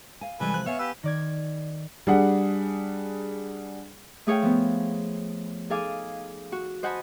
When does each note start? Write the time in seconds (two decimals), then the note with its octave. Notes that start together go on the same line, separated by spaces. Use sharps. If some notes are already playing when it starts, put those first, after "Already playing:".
0.21 F5 G#5
0.40 C3 E3 G3 G#3 G4 A4 B4 G#5
0.54 F3 F#6
0.66 B3 C#5 E5 F5 G#5
0.79 G4 B4 E6
1.03 D#3 D5 G#6
2.07 G3 D4 G#4 F#5
4.27 A3 G#4 C#5 F5 G5
4.42 F3 B3
5.70 D#4 G#4 A4 F5 G#5 D6
6.52 F#4
6.83 C5 D#5 F#5 G#5 A5 B5